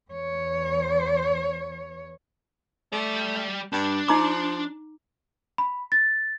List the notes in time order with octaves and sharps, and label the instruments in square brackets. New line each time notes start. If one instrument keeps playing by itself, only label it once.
[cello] E2 C#5
[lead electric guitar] G3 D5 [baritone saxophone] A3
[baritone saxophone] G2 [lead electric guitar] D4
[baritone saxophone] F3 [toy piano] D#4 A#5 D6
[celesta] B5
A6